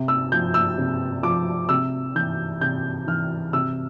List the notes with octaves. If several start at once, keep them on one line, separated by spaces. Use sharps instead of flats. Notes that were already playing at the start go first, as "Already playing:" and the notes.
Already playing: C3
E6
F3 G6
E6
C3
F3 D6
C3 E6
E3 G6
C3 G6
E3 F6
C3 E6